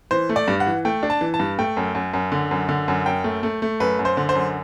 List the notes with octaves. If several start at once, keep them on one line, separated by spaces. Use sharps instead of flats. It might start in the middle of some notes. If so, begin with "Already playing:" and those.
E3 C5
A3
D5
G2
F#5
E3
A3 G5
D4
A5
E3
A5
G2
A3 G5
F#2
F#2
F#2
D3
F#2
D3
F#2
F#2 G5
A3
A3
A3
F#2 B4
F#2
C5
D3
C5
F#2